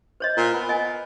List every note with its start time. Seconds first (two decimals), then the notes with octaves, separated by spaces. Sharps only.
0.20 C5 C#5 D#5
0.37 A#2
0.53 B3
0.69 D#5 G#5